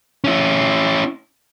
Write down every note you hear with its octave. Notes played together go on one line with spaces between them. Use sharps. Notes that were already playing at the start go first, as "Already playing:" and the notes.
C#4 E4